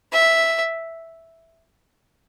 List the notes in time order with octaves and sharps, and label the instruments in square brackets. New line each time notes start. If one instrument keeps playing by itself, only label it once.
[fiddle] E5